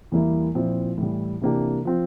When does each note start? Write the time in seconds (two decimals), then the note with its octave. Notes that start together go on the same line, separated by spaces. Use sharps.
0.12 E2 E3 G3 A#3 E4
0.55 A#2 F3 C4 E4
0.98 A2 E3 G3
1.41 C3 E3 A#3 D4 G4
1.85 F3 C4 F4